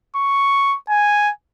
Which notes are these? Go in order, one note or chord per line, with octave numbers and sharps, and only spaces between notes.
C#6
G#5